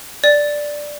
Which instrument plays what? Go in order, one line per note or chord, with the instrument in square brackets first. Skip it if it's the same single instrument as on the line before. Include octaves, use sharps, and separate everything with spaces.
[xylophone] D5